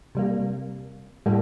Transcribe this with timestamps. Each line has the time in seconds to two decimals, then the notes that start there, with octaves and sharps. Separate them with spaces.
0.15 C3 G3 A#3
1.26 A2 G3 A#3